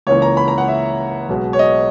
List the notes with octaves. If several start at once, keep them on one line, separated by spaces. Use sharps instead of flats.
C#2 C#3 E3 A#3 C#5
A#5
B5
A#5
F#5
E5
B1 B2 G#3
C#5
D#5